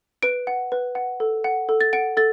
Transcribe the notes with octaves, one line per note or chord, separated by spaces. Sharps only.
B4 D7
F#5
B4
F#5
A4
F#5
A4
A6
F#5 D7
A4 A6